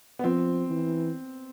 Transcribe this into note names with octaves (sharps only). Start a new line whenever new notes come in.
B3
F3 C4
E3